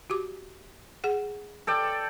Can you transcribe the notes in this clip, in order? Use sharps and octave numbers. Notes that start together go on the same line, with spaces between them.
F#4 G4 D6
G#4 F#5
A4 D5 G5